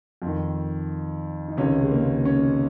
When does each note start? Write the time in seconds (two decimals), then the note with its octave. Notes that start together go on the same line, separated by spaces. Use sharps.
0.22 F2 D#3
1.48 D#4
1.57 C#2 C3 D#3 C#4
1.81 G#3
1.91 A#3
2.25 C#4